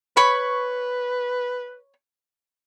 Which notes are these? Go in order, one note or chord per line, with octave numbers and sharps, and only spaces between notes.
B4 C#5 B5 C#6